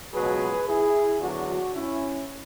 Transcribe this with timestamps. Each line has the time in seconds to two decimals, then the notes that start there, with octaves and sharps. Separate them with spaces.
0.14 C#2 B2 F#3 G#4 B4
0.68 E4 G#4
1.21 E2 D3 F#3 D4 F#4
1.74 C#4 E4